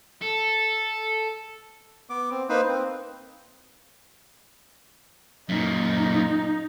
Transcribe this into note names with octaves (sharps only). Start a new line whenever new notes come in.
A4
B3 D6
C4
A#3 D#4 B4 C5
C4
F#2 A#2 D#4